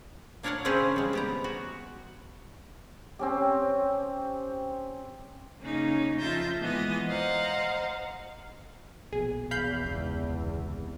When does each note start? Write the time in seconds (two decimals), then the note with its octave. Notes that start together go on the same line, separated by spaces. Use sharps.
0.43 A#3 D4 A#4 C#5 F5 F#5
0.65 C#3 C4 C#4 G#4 B4 C5
0.96 G3 G#3
1.13 B3 G4 A#5
1.44 F#4
3.19 C4 C#4 G4
5.60 C#3 A#3 C#4 D#4
6.19 F2 F4 E5 A5 G6 A#6
6.60 A#2 E3 G#3 B3 D#5 D#6
7.06 C5 D#5 F5 F#5 A#5
9.13 A#1 B2 G#4
9.51 E2 F5 B5 G6
9.85 G1 C#2 C3